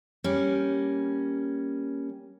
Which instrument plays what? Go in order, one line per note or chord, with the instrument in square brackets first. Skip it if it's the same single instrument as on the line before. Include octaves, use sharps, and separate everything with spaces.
[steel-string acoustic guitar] G3 A#3 C#4